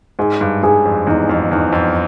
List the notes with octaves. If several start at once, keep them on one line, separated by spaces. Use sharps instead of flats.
G#2 G#4
G2
G2 G#4
F2
E2 D#4
F2
E2 D#4
F2